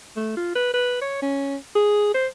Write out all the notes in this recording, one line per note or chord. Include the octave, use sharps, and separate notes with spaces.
A3
F4
B4
B4
C#5
C#4
G#4
C5